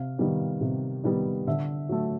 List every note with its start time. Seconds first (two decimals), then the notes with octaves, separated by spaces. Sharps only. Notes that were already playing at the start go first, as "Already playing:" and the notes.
Already playing: C3 F5
0.18 D#3 G3 B3
0.61 C3
1.03 D#3 G3 B3
1.47 D3 E5
1.89 F#3 A3